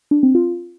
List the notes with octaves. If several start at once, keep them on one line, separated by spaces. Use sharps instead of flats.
D4
C4
F4